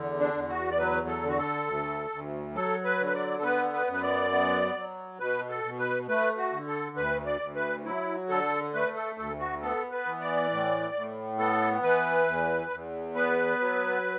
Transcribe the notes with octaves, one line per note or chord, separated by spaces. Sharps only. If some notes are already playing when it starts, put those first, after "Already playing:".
Already playing: E2 D3
D4
E2
F#4
D5
F#3 B4
A4
D3
F#4
A4
D2
D2
F#3 A4
B4
D3
B4
D5
A4
B3 B4
B4
F#2 B4
D5
B3
F#3
B2 B4
A4
B2
B4
A3 B4
F#4
D3
A4
D2 B4
D5
D2
B4
F#3 E4
D3 A4
A3 B4
A4
D2 A4
F#4
B3 A4
B4
E3
D5
A2
A2
B3 A4
E3 B4
E2
E2
B3 B4
F#3